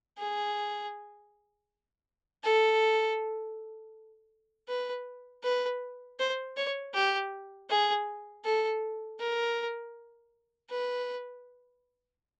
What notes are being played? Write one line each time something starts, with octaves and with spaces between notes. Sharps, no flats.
G#4
A4
B4
B4
C5
C#5
G4
G#4
A4
A#4
B4